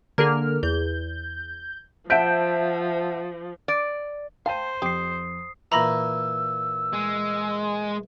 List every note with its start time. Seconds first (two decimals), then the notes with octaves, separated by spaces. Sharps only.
0.18 D3 A#3 G#4 A#4 F6
0.63 E2 G6
2.10 F3 C5 E5 F#5 A5 G6 B6 D7
3.68 D5
4.46 C5 F5 G5 A5 D#7
4.82 F2 G4 D#6 C7
5.72 A#2 E3 A#5 B5 E6 A#6
6.93 G#3